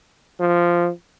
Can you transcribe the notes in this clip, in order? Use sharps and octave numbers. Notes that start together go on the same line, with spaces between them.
F3